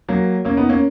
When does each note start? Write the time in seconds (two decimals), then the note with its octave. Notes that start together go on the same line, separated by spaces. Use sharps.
0.08 F#3 A#3
0.45 A#3 C#4
0.57 B3 D#4
0.69 A#3 C#4